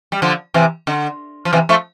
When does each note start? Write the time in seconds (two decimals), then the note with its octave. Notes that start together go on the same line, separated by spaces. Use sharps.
0.12 G3
0.22 D3 F3
0.54 C3 E3
0.87 D3
1.45 F3
1.53 C3 E3
1.69 F3 A3